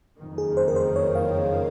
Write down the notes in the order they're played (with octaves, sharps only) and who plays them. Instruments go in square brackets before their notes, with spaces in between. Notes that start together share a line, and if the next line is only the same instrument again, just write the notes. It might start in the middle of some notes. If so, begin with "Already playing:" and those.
[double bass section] F#1 F2 D#3
[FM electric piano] G#4
C5
A#4
C5
C#5
F5